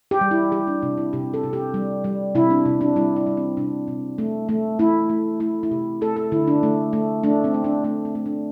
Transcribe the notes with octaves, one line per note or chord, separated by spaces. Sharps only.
G4
G3
E4
G3 G4
D4
C3 D4
E4
C3 G4
A4
C3
G4
G3
G3
C3 E4
D4
C3
D4
G3 E4
E4
G3
C4
C3 D4
C3
A3
A3
A3 E4
A3
A3 E4
E4
C3 G4
A3 A4
A4
D3 E4
D4
A3
A3
A3 D4
C4
A3
D4
A3 D4
C4
A3
D4